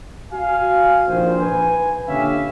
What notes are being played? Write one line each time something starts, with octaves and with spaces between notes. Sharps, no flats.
F#4 F5 G#5
A#1 D#3 C5
B4 G#5
A#2 D3 C#4 G4 E5 F5